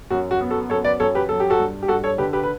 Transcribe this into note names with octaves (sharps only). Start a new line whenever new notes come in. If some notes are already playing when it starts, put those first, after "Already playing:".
F#2 F#4
F#4
B3
F#4 A4
F#2 A4 C#5
B4 D5
F#2 A4 C#5
G4 B4
F#3 A4
G4
F#4 A4
G2
G4
G2 F#4 A4
A4 C#5
D3 G4 B4
G4 B4
B4